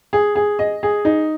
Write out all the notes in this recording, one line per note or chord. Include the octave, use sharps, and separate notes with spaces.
G#4
G#4
D#5
G#4
D#4